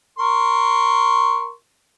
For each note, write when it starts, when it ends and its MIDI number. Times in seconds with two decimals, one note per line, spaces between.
0.18 1.50 70
0.18 1.50 84
0.18 1.50 85